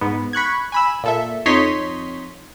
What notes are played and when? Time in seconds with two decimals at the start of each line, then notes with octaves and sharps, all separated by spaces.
0.01 G#2 B3
0.33 B5 C#6 F#6 G#6
0.72 G#5 B5 E6
1.03 A#2 A4 E5
1.46 F2 D#4 C#5 D#5 C6 B6